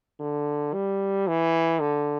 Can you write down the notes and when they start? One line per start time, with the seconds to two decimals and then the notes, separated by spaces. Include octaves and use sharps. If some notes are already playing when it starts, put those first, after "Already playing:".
0.20 D3
0.74 G3
1.28 E3
1.81 D3